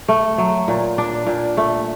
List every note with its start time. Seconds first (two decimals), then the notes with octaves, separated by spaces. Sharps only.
0.08 A3
0.38 F#3
0.68 A#2
0.98 D4
1.26 A#2
1.57 A3